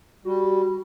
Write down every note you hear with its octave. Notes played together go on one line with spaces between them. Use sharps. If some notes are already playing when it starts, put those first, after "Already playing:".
G3 F#4